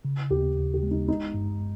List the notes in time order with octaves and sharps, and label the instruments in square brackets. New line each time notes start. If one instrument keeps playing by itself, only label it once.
[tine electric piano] C#3
[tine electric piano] D#2 [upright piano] G4
[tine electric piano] D#2
[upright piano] G4
[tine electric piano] G#3
[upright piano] D#4
[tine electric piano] G1 [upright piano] D#4
[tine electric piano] G2